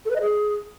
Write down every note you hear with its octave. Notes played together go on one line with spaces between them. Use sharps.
A4
B4
D#5
G#4